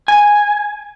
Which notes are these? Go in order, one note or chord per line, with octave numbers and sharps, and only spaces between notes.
G#5